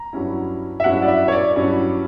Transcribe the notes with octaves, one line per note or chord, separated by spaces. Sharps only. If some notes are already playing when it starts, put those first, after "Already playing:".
Already playing: A#5
G2 F#3 C#4 E4
E5
G2 F#3 C#4 E4 F#5
D5
E5
C#5
D5
G2 F#3 C#4 E4